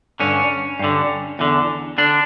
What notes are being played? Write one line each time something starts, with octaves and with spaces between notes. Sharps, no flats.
G2 D3 C#4
G2 D3
E2 D3
D3 D4